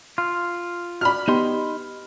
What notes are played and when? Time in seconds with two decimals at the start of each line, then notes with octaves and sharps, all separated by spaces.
0.18 F4
1.01 F#4 D5 B5 F6
1.28 B3 D#4 G4 D#5 C6